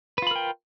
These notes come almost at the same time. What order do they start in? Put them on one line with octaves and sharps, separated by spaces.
B4 F4 B5 A#4 G5